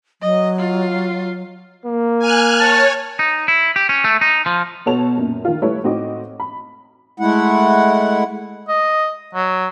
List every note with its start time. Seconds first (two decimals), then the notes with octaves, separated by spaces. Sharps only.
0.22 F#3 D#5
0.59 F4
1.86 A#3
2.19 G#5 F6 F#6
2.60 C#5 A5
3.19 D#4
3.48 E4
3.76 G4
3.89 C#4
4.04 A3
4.21 D#4
4.46 F3
4.86 B2 B3 A4 C#5 A5 F7
5.17 F#2 A#2
5.45 D#3 F4
5.62 G3 A3 E4 B4 C#5
5.84 A2 C4 D#4 F#4 D#5 D6
6.40 B5
7.20 G#3 A3 E4 F#5
8.68 D#5
9.34 F#3